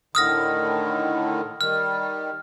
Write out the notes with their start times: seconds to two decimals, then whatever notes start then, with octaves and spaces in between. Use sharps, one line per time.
0.15 A2 D3 D#3 D#6 F6 A#6
1.61 D#3 G3 F6